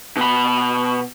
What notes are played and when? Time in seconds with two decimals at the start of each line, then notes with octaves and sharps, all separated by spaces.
0.17 B2 B5